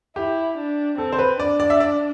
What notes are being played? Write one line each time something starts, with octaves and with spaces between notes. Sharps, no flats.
E4 G4
D4
C4 A4
C5
B4
D4 D5
D5
E5
D5